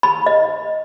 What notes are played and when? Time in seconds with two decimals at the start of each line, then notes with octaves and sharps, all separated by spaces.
0.03 B5
0.26 D#5